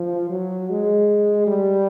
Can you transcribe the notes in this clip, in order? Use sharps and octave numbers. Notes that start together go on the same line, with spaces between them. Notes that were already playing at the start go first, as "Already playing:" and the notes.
Already playing: F3
F#3
G#3
G3